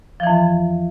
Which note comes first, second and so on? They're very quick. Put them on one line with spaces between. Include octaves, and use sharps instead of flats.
F3 E3 F2